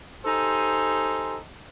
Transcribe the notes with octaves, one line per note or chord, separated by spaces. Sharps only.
D#4 G4 A4 C5 G#5 C6